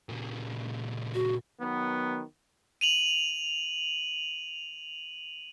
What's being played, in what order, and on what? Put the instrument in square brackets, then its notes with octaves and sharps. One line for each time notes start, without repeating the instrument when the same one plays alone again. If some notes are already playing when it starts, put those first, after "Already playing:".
[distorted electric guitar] A#2 C#3
[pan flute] F#4
[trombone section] D#3 F#3 B3
[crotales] D#7 F7 F#7